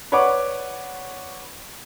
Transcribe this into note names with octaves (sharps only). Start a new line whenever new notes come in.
B4 C#5 D5 F#5 D6